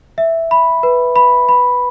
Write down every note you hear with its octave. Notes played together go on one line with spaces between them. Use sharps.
E5
B5
B4
B5
B5